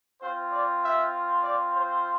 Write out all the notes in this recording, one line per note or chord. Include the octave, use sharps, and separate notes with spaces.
C4 F4 C5
D5
E5
D5
C5